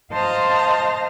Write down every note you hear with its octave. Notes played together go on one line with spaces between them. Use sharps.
C5 D#5 F5 A5 A#5 C6